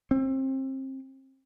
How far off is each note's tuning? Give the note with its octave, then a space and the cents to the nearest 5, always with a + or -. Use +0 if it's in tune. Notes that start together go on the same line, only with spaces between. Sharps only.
C4 +30